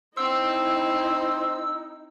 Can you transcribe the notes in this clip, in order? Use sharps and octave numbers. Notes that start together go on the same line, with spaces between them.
C4 D#4 E4 C5 E6